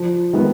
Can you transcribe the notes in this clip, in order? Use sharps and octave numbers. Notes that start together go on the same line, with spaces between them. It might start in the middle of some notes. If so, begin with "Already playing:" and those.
Already playing: F3
D#3 G#3 B3